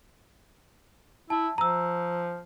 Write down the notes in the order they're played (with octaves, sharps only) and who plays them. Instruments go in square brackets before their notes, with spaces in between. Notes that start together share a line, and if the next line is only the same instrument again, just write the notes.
[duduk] E4 [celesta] A5
[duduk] F3 [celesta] A#5 E6